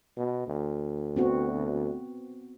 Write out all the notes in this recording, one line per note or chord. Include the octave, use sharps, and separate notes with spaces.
B2
D2
B3 C4 F#4